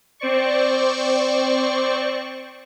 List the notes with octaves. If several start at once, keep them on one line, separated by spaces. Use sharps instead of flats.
C4 C5 D5 C#6